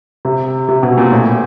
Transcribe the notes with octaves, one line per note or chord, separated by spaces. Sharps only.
C3
C3
B2
A#2
A2